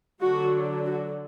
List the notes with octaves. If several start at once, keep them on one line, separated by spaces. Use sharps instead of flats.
D3 F#3 D4 F#4
F#4